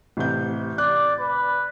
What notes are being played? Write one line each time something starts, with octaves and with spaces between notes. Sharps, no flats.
A1 C3 G6
D5 F#6
B4